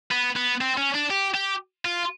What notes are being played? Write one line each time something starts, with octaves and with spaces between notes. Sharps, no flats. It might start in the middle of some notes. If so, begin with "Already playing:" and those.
B3
B3
C4
C#4
D4
G4
G4
F4